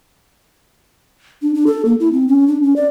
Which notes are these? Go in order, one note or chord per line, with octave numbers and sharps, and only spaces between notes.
D4
D4
A4
A#3
E4
C4
C#4
D4
C#4
D5